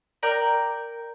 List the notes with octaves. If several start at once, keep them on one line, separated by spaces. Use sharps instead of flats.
A#4 D5 G5